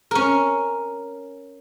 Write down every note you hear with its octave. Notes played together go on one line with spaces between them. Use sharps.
C#4 A#4